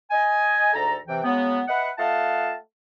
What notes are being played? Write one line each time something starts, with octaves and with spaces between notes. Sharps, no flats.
D#5 G#5
D2 G#2 A4 A#5
C3 E3 G5
C#3 F#3 G#3 B3
B4 D#5 E5 F#5
A3 F4 D#5 F5 F#5 A5